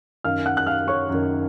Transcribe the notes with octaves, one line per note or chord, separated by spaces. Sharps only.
F#2 D#3 F5 F6
F#5 F#6
F#6
F5 F6
C#5 C#6
F#2 D#3